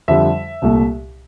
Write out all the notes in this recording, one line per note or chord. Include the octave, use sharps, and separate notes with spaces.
F2 D3 G3 E5
C2 A#2 A3